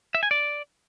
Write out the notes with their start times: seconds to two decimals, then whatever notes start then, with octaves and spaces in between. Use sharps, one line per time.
0.15 E5
0.23 G#5
0.31 D5